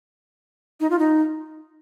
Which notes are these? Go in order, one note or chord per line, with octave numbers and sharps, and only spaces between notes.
D#4
F4
D#4